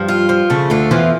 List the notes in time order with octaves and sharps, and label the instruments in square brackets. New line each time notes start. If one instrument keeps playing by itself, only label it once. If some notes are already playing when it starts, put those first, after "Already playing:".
Already playing: [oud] G2 G3 [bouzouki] F3
[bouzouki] F4
F3
[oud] C#3 [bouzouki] A3
[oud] D2 D3 [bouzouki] F4
[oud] E2 E3 [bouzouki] F3